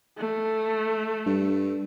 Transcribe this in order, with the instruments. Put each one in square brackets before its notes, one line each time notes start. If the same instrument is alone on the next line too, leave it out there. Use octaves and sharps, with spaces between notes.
[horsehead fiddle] A3
[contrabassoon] G2